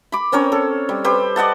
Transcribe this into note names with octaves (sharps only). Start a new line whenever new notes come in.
B5 D6
C4 C#4 A#4 C#5
A4
G3
G4 B4 C5
D5 D#5 F#5 A5